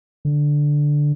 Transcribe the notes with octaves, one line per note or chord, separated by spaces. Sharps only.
D3